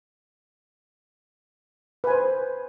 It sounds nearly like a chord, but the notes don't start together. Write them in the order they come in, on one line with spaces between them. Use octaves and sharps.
B4 G#5 C5